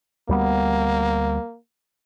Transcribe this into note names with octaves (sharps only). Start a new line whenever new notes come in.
D2 G3 A#3 B3